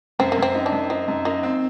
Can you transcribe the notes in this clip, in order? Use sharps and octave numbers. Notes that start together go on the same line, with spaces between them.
F#2 C4
A#3
F#2
C4
D#4
D4
F#2
C4 D#4
F#2
A#3 D#4
C4